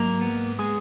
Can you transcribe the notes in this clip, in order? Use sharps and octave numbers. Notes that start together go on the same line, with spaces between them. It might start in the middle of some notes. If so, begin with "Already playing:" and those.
Already playing: G#2 F#3 A#3 A#4
B3
G#3 G#4